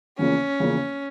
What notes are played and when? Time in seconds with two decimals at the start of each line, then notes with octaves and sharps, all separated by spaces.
0.18 E2 C#3 F3 A#3 C#4
0.60 E2 C#3 F3 A#3